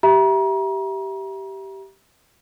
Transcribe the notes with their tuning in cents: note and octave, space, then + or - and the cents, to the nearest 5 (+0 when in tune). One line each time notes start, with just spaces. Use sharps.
G4 -15 E5 +0 A#5 +35